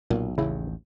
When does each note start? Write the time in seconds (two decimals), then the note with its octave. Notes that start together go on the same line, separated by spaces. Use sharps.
0.10 B1 A#2
0.38 A1 D#2 C#3 E4